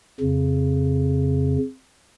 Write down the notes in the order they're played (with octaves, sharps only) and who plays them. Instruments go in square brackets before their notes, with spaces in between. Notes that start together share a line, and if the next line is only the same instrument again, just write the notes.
[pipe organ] F2 C#3